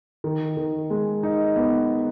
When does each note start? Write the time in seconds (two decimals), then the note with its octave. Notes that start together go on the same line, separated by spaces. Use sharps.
0.24 D#3
0.57 D#3
0.90 G#3
1.23 D#4
1.56 B3